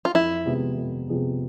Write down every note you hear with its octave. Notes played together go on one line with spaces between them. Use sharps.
F4
F2 E4
C3 F3 G#3 B3
F2
C3 F3 G#3 B3